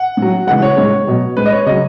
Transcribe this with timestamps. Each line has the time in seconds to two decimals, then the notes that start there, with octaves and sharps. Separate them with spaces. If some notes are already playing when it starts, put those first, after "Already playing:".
Already playing: F#5
0.17 A2 F#3
0.47 C#3 E3 G#3 F#5
0.62 C#5
0.77 A2 G#3 C#5
1.07 B2 F#3
1.37 A2 G#3 B4
1.46 D#5
1.52 C#5
1.66 C#3 F#3 D#5